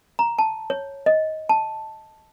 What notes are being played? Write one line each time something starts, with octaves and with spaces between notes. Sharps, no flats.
A#5
A5
C#5
D#5
A5